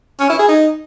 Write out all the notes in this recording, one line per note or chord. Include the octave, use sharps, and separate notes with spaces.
C#4
E4
G#4
D#4